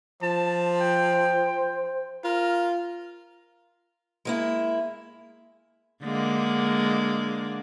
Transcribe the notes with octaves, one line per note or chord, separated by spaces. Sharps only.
F3 C5 A5
G5
F4 A#4
G#3 A#3 E4
D3 G#3 A#3